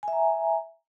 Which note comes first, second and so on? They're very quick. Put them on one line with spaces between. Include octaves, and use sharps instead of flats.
G#5 E5 A#5